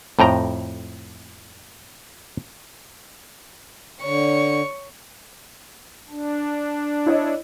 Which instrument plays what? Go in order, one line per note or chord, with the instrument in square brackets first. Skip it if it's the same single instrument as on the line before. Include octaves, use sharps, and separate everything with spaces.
[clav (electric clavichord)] F2 A2 G5 A#5
[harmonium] D3 [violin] C#5 C#6
[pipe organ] D4
[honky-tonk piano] E4 C#5 D#5